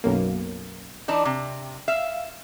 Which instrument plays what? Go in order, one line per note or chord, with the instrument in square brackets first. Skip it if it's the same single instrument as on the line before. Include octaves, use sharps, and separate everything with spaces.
[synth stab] B1 F#2 A#3
[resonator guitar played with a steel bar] E3 D4 D#4
C3
[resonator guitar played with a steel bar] E5 [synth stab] F5